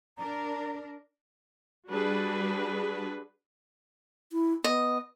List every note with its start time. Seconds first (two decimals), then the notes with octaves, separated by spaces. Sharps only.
0.18 D4 A#4 A#5
1.90 G3 D4 F#4 G#4 B4
4.32 E4
4.64 B3 D#5